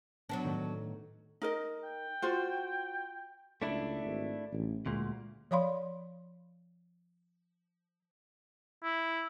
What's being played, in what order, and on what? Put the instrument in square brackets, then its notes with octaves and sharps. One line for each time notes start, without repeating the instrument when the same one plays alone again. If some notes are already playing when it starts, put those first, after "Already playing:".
[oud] F#3 B3 D4
[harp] A2 D#3
[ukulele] D#4 A#4 D#5
[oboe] G5
[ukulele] F4 F#4 C5
[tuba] C#2 [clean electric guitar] A3 D4 E4
[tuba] G#1
A1
[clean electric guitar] D2 A#2 [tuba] G#3
[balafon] F3 C#5 D5 F5 B5 C6
[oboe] E4